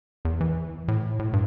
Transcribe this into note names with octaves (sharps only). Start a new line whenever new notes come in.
E2
E3
A2
A2
G2